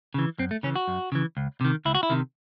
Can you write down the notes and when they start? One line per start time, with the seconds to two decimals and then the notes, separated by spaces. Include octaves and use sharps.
0.14 C#3 E3
0.39 F#2 C4
0.51 A3
0.63 C#3 E3 C#4
0.76 F#4
0.88 F#2
1.12 C#3 E3
1.37 C#2
1.61 C3 D#3
1.85 C#2 E4
1.95 F#4
2.03 E4
2.10 C3 D#3